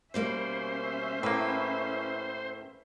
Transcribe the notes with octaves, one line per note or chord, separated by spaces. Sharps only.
B2 G3 A#3 C#4 C5 E5
A2 A#3 B4